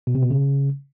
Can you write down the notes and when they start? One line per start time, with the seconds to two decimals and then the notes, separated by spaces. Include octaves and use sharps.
0.07 B2
0.15 C3
0.23 B2
0.30 C#3